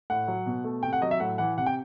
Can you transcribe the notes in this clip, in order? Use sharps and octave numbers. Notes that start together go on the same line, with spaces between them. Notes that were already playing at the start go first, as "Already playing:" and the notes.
A2 F#5
F#3
B2
A3
C3 G5
F#5
F#3 D#5
E5
A2 F#5
E3 F#5
C3 F#5
G5